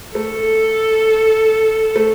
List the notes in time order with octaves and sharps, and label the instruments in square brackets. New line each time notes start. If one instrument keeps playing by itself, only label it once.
[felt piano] A3 [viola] A4
[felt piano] A3